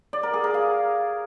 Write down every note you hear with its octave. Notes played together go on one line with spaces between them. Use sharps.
D5
A#4
G#4
A#4
F5